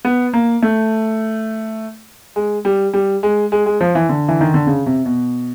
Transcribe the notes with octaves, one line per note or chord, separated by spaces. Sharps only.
B3
A#3
A3
G#3
G3
G3
G#3
G#3
G#3
F3
E3
D3
E3
D#3
D3
C#3
C3
B2